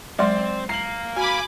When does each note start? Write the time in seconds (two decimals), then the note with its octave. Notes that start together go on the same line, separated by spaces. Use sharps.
0.19 F#3 G#3 C4 C5 D5 C6
0.69 F5 A#5 C7 F#7
1.16 F#4 G#5 B5 D6